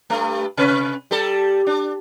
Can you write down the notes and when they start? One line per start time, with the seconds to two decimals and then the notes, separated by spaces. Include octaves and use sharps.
0.10 G2 A3
0.57 C3 B4
1.11 G3 A4
1.67 D4